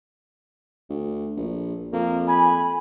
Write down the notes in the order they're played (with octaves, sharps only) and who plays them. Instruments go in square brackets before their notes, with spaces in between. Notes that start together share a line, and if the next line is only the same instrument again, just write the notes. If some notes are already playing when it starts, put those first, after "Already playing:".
[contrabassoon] D2
A#1
[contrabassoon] F2 [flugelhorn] A#3
[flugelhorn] G#5 [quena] B5